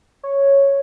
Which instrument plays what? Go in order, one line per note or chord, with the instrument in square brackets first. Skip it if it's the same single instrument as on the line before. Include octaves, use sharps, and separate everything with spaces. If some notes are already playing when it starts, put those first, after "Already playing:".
[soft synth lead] C#5